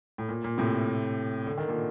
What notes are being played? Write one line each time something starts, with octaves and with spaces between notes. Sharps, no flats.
A2
A#2
A#2
A2 C3
D3
D#3
A#2 D3